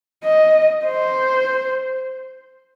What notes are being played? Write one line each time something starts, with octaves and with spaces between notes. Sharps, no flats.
D#5
C5